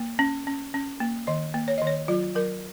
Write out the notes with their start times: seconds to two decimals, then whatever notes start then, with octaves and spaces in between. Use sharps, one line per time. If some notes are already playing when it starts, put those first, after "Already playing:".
Already playing: A#3
0.19 C#4
0.47 C#4
0.74 C#4
1.00 A#3
1.27 D#3 D#5
1.54 A#3
1.68 C#5
1.78 D#3 D#5
1.87 C#5
2.08 F#3 F4
2.36 F#3 A#4